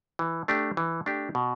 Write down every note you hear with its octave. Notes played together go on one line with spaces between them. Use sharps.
E3
A3 D4 G4
E3
A3 D4 G4
B2